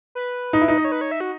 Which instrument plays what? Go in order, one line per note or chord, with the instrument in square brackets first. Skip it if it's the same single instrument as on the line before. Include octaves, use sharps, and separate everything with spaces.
[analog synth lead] B4
[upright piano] D#4
E4
D#4
[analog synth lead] D#5
C#5
B4
C#5
E5
F#4